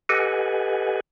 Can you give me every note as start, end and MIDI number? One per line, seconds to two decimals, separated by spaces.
0.09 1.00 67
0.09 1.00 69
0.09 1.00 71
0.09 1.00 75
0.09 1.00 78
0.09 1.00 80